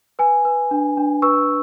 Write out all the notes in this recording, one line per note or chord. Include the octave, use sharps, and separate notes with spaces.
B4 G#5
B4
D4
D4
B4 C#6 E6